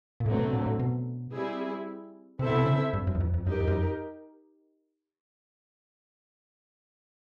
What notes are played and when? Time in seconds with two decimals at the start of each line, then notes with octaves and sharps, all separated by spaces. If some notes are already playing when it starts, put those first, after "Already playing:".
0.20 A#2
0.26 A2 D3 F#3 A3 C4
0.39 B2
0.53 A#2
0.66 A2
0.79 B2
1.33 G3 C4 E4 G#4
2.39 C3 C4 E4 A4 C5 E5
2.50 B2
2.59 C3
2.66 C#3
2.93 G2
3.07 F#2
3.15 E2
3.21 F2
3.34 F2
3.47 F#2 D#4 G4 A#4
3.60 F2
3.67 F#2
3.73 F2